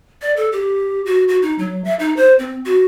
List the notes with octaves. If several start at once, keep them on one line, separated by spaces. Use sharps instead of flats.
D5
A4
G4
F#4
F#4
D#4
F#3
E5
D#4
C5
C4
F#4